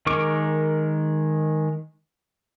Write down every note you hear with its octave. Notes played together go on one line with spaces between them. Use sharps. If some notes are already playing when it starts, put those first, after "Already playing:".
D#3 G#3 A#4 C#6 D6